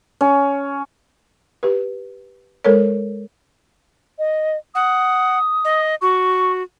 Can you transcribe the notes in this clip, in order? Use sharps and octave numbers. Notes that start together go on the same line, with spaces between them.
C#4
G4 B4
G#3 A4 A#4 C5 C#5
D#5
F#5 D#6
D#5
F#4 C#6